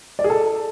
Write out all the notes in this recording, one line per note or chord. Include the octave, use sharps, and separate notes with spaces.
D5
G#4
A4